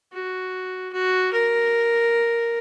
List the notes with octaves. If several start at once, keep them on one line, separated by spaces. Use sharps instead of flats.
F#4
F#4
A#4